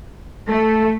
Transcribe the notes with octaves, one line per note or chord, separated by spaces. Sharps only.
A3 A4